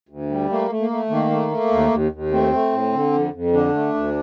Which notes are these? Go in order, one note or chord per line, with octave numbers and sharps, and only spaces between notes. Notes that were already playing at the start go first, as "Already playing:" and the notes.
D2
G3
A3 A#3
A3
A#3
A3
D#3 A#3
A3
A3
D#2
D#2
D#2
A3 C4
A3
A2
D3
F2
F2
D3 D4
A3
D2